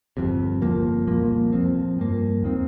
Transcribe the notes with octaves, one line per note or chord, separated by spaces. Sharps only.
G1 F2 C3
G1 F2 F3 A#3
C2 A#2 F3 A#3
F2 F3 C4
G2 F3 A#3
D#2 D#3 C4